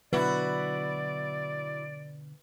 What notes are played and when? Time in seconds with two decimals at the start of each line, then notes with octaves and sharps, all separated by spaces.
0.13 B2 D3 F#3 E4 F#4 B4 D5